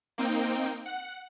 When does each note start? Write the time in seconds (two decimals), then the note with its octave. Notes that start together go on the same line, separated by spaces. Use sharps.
0.18 A#3 C4 D#4 G5
0.86 F#5